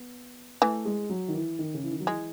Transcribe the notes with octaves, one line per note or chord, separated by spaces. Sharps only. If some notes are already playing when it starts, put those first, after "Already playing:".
Already playing: B3
E3 A3
G#3
F#3
D#3
E3
D#3
C#3
E3
D#3
F#3
E3 G#3